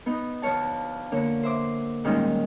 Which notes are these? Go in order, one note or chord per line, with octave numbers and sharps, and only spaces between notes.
B3 D#4
D2 D3 F3 C#5 A5
D3 A#3 C#5 C#6
C5 E5 D6
A#2 D#3 G3 G#3 C#4 D#4